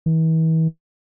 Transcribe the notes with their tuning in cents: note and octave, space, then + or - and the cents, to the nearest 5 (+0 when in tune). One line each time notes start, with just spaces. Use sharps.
E3 -40